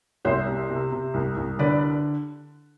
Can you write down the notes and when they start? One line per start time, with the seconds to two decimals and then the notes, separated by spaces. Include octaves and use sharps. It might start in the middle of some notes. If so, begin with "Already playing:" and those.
0.25 C2 C5 E5
0.47 C3
0.70 C3
0.92 C3
1.14 C2
1.37 C2
1.59 D3 B4 D5